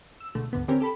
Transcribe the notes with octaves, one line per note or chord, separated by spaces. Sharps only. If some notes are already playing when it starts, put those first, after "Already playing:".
E6
C#2 B2 D3 A3
D2 G#2 D3 B3
D3 E3 C4 C#4 G4 A#4
G4 A4 B5